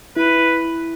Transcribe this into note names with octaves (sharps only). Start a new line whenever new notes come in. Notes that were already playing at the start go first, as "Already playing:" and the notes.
E4 B4